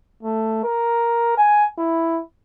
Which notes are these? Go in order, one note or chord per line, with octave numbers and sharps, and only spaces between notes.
A3
A#4
G#5
E4